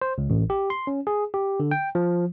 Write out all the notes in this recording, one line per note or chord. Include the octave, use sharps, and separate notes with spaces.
C5
C#2
A1
G4
C6
C#4
G#4
G4
D3
G5
F3